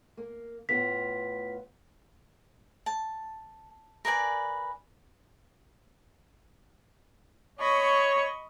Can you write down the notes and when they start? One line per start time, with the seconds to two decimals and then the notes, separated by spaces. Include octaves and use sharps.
0.17 A#3
0.69 A2 B3 F4 B6
2.86 A5
4.05 A#4 B4 D5 G#5
7.59 C#5 D#5 B5 C#6